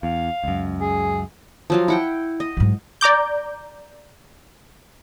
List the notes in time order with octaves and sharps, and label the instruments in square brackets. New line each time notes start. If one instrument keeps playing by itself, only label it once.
[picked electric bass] E2 [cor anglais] F5
[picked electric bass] C#2 F#2
[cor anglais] G#4
[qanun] F3 F#3 F4
E4 F#5 G5
D#5
[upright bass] G#2 F#3
[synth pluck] D5 A#5 D6 G6